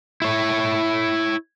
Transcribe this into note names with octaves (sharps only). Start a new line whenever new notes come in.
E4 C#5